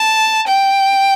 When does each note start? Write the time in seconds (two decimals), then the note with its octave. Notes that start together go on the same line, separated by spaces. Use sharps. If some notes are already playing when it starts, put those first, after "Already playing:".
Already playing: A5
0.48 G5